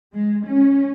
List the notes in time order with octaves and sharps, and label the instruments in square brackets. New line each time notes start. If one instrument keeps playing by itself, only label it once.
[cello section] G#3
C#4